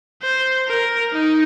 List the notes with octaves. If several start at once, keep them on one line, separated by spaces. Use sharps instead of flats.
C5
A#4
D#4